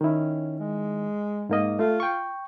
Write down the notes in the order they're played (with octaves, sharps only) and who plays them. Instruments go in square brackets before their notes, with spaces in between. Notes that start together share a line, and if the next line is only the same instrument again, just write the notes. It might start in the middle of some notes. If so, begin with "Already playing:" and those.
[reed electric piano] D#3 E4 [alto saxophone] C#4
[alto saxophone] G#3
[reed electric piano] G#2 A#3 D#5
[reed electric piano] A3 [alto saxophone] F4
[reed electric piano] G5 C#6